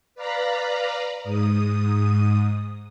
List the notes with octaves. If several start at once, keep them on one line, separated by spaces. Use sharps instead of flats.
B4 D5 F5 A#5 B5
G#2 D#6